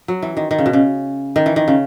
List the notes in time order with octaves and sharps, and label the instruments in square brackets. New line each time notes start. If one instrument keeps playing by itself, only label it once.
[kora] F#3
E3
D#3
D#3
C#3
B2
C#3
D#3
E3
D#3
C#3